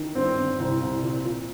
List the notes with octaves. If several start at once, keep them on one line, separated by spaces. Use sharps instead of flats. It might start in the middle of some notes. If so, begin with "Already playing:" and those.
Already playing: D#3
G2 C4
G1
C2 C4
C2
A#2
A#2